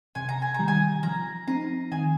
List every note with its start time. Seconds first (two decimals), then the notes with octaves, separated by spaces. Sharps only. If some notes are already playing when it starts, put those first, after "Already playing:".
0.15 C3 G#5
0.29 A#5
0.42 G#5
0.54 D#3 G3 A#5
0.68 G#5
1.03 F3 A#5
1.47 C4 D#4 A#5
1.92 D#3 G#5